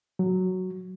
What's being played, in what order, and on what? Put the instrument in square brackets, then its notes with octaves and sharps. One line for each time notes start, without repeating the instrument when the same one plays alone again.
[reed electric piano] F#3